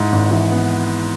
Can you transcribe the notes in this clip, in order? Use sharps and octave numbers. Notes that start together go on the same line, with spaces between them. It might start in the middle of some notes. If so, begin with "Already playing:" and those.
Already playing: G#2 E4
G#1
E3
B3